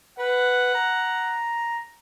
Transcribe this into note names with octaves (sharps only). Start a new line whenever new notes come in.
B4 F#5
A#5